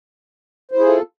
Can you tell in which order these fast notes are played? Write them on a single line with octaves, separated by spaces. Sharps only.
C5 E4 G#4 F4 A4